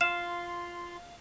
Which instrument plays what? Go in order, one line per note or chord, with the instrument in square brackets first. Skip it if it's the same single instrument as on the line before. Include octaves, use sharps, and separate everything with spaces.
[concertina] F4 C6 [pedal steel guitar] F5 [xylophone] E7